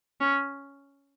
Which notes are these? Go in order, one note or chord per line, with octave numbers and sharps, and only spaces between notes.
C#4